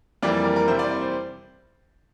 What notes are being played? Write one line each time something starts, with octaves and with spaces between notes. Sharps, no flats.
F2 E3 G3 A#3 D5
A#4
A#4
C3 G3 C4 E4 C5
D5
D5
C5